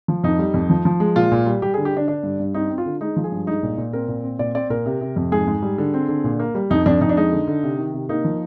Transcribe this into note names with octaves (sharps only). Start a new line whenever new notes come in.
F3
F2 D#4
G3
F2
F3
F3
G#3
A#2 F4
A#2
G3
G3 G4
G#4
D3
G4
D3 D4
D3 D4
G2
G2
C4 D#4
C4
F4
D3
G#3 D#4
F3
G#4
G2
G#3 D#4
A#2
A#2
C4 A#4
A#2
C4
A#2 D5
C4 D5
A#2 A#4
C3
C3
F2
G#2 G#4
G#2
G3
D3
C4
D3
A#2
A#3
G3
F2 D#4
F2 D4
F2 D#4
D4
G#3 D#4
D3
D3
C3
D#3
C3
A#3 D#4
F3